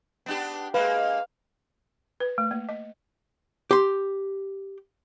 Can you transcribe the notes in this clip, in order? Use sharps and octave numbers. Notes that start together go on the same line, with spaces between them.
B3 D4 G4
G#3 A#3 B4 F5
B4
A3
A#3
D#5
G4 C6